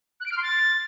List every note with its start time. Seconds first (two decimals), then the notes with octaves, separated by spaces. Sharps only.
0.20 F#6
0.26 D7
0.31 F6
0.37 C6
0.42 A6